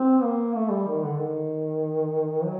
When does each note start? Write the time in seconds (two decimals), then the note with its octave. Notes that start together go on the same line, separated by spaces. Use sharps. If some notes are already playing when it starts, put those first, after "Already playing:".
Already playing: C4
0.24 A#3
0.55 A3
0.71 G3
0.86 D#3
1.02 D3
1.18 D#3
2.43 F#3